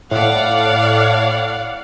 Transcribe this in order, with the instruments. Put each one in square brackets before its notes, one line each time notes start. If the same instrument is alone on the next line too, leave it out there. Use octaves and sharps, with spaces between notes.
[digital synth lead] A2 [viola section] D5 F5 F#5